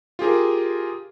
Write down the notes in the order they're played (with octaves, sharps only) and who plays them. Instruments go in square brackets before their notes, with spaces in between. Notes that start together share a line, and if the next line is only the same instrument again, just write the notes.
[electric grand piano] F4 G4 G#4 A#4